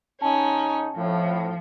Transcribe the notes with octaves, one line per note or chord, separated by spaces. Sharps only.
C#3 C#4 D#4 A5
F2 A2 F3